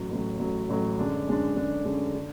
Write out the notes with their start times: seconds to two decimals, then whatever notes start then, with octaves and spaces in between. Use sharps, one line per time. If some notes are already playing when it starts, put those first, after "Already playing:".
Already playing: A1 A2 F#3
0.10 A1 A2 F#3
0.39 A1 A2 F#3
0.69 A1 A2 F#3
0.99 F#2 D3 G#3 D4
1.27 F#2 D3 G#3 D4
1.56 F#2 D3 G#3 D4
1.85 F#2 D3 G#3 D4
2.15 D3